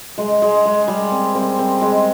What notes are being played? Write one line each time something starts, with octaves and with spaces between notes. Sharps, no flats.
G#3
G#3
G#3
G3
C4
C4
C4
G#3